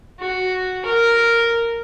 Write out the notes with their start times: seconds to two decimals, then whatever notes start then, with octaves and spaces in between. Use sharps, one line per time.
0.20 F#4
0.85 A#4